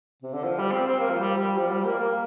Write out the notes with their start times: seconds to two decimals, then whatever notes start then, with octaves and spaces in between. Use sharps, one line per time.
0.22 C3
0.34 D3
0.44 F3
0.59 G3
0.72 C4
0.87 C4
1.00 A#3
1.10 F3
1.20 G3
1.38 G3
1.57 F3
1.71 G3
1.85 A#3
1.99 A#3